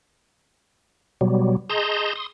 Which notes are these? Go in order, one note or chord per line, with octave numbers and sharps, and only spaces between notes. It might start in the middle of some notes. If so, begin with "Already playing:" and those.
B2 F#3 G3
G#4 D#5 A5 A#5 C6 G6
C6 D#6